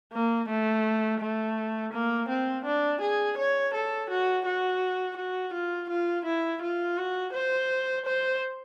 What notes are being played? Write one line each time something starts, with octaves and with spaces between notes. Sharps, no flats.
A#3
A3
A3
A#3
C4
D4
G#4
C#5
A4
F#4
F#4
F#4
F4
F4
E4
F4
F#4
C5
C5